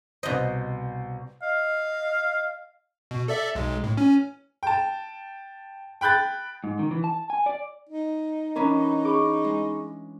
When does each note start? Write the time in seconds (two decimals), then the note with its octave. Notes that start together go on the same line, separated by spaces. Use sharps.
0.23 C2 B2 C5 D#5
1.42 D#5 F5
3.11 B2
3.28 A4 D5 E5
3.55 B1 G#3
3.84 A2
3.97 C#4
4.63 G5 A5
6.01 G5 B5 F#6 G6 A6
6.64 G#2
6.79 D#3
6.91 E3
7.04 A5
7.30 G#5
7.46 D5
7.89 D#4
8.55 E3 C#4 D4 A#4 A#5 B5
9.05 G#4 B5 C#6 D6
9.45 G#3